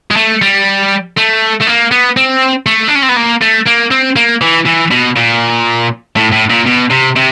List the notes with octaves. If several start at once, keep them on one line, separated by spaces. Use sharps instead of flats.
G#3
A3
G3
A3
A3
A#3
B3
C4
A3
D4
C#4
C4
B3
A#3
A3
A#3
C4
A#3
E3
E3
B2
A#2
A2
A2
A#2
B2
C3
C3